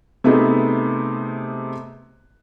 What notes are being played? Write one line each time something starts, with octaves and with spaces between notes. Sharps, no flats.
C3 A3 B3 D#4 G#4